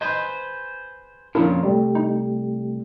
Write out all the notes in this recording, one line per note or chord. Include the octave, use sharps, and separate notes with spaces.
G#4 B4 C5 D#5
F2 A#2 C#3 D4 E4 A#4
C2 G3 A3 G4
D#4